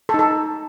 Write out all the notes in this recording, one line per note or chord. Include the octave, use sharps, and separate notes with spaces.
A4
D#4
A4